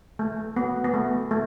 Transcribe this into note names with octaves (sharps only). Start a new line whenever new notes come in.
A3
B3
B3
A3
A3